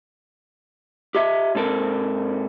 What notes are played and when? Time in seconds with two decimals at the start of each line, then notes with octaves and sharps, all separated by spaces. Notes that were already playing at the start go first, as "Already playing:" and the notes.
1.15 G4 D#5 E5
1.55 G#2 C4 A4 A#4